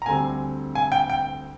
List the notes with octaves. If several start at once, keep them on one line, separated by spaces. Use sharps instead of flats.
A#5
D2 D3 G3 C4 G#5
G#5
G5
G5